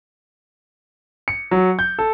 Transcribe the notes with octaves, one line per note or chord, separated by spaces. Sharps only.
C#7
F#3
G6
A4